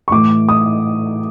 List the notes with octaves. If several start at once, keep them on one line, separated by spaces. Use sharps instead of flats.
C#6
A2 E3 D6
D#6